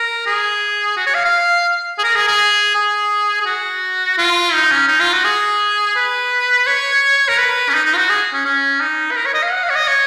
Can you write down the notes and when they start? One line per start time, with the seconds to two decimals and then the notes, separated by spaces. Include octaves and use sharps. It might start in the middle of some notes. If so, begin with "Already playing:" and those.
Already playing: A#4
0.26 G#4
0.96 F#4
1.06 C#5
1.14 F5
1.24 F5
1.98 G#4
2.04 A#4
2.16 G#4
2.27 G#4
2.75 G#4
3.41 G#4
3.46 F#4
4.18 F4
4.53 D#4
4.71 C#4
4.88 D#4
5.00 F4
5.13 F#4
5.24 G#4
5.96 B4
6.67 C#5
7.28 A#4
7.37 B4
7.69 C#4
7.74 D#4
7.85 D#4
7.93 F4
7.97 F#4
8.09 G#4
8.33 C#4
8.45 C#4
8.81 D#4
9.11 B4
9.16 A#4
9.25 C#5
9.34 D#5
9.43 F5
9.51 F#5
9.63 F5
9.70 C#5
9.75 D#5
9.87 C#5